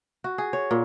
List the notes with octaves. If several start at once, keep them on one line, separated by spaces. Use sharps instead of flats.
F#4
G#4
C#5
A#2